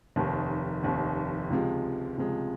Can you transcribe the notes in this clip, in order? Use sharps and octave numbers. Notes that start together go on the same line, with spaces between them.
F1 D#2 D#3
F1 D#2 D#3
C#2 C3 F3 G#3
C#2 C3 F3 G#3